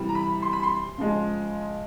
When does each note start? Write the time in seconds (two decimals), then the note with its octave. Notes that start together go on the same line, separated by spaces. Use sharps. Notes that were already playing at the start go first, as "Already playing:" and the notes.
Already playing: C3 E3 G3
0.09 A#5
0.15 B5
0.42 C6
0.53 B5
0.63 C6
0.98 C#3 F3 G#3